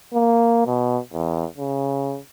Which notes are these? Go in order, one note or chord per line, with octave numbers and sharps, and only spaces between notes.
A#3
B2
E2
C#3